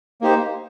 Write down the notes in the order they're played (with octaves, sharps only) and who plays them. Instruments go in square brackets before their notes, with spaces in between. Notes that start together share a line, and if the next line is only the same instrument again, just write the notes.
[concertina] A#3 D#4 G4 C5